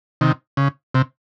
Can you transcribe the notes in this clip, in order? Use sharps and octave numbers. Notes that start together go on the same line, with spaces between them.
C3 D#3
C#3
C3